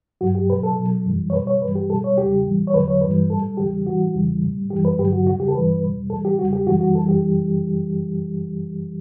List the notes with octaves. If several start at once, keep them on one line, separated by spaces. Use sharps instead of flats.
G2 F#3 F#4
G4
B2 F#3 B4
A4
B2 F#3
F#2 E3 G3
C#5
B2 G3 B4
C#5
G2 E3 G3 B4
G4
B2 G3 A4
C#5
E2 C#3 G3 G4
A2 E3 G3
C#5
E2 D3 F#3 B4
C#5
G2 E3 G3 B4
A2 G3 A4
E2 C#3 E3 G3 G4
A2 E3 G3 F#4
E2 C#3 E3 G3
A2 G3
F#2 E3 G3 G4
B4
G2 D3 F#3 G4
F#4
E2 C#3 G3 F#4
G4
A4
G2 E3 G3 B4
E2 B2 G3
A2 E3 G3 A4
G4
E2 C#3 G3 F#4
G4
F#2 E3 G3 F#4
F#4
F#2 E3 G3 A4
G4